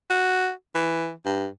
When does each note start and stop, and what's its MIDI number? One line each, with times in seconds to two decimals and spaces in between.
0.10 0.51 66
0.75 1.12 52
1.25 1.48 43